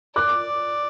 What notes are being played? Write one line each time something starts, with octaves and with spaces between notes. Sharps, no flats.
D5 D6 F#6